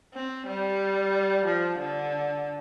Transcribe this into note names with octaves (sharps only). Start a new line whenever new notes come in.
C4
G3
F3
D3